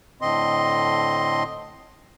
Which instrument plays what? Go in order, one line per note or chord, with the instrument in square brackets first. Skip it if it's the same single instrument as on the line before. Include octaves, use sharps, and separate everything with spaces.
[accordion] A2 D3 C4 D#5 C6